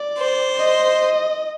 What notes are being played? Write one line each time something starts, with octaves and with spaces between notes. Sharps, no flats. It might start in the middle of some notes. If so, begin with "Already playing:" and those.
Already playing: D5
C5
D#5